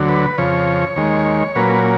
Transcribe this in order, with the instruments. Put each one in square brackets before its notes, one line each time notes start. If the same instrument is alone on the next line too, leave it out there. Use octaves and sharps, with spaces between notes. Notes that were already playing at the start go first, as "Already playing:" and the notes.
Already playing: [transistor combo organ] D2 D3 F#3
B4
F2 C#3 F3 C#5
D#2 D#3 G#3
A#2 F#3 A#3 C#4 B4